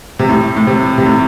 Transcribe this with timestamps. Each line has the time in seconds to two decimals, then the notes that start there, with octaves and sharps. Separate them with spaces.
0.19 C3
0.29 A2
0.56 A2
0.67 C3
0.98 C3
1.05 A2